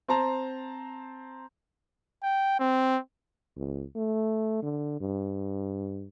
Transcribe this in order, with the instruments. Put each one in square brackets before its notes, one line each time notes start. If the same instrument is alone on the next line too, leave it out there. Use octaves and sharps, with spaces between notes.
[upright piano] C4 C5 A5 A#5
[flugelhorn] G5
C4
[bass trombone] C#2
A3
D3
G2